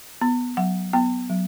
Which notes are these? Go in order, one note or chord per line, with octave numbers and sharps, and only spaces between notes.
B3
F#3 F#5
B3 G5
F#3